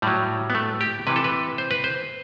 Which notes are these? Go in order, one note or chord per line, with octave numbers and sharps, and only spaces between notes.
A2 F#3 G3
B3
A3
G4
C3 E3 B4
A4
B4
C5
B4
C5